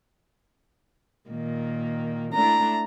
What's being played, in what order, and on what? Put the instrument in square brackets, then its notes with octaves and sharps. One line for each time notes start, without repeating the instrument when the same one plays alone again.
[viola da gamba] A#2 D#3 A#3
[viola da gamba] A3 D4 E4 [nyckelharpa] A#5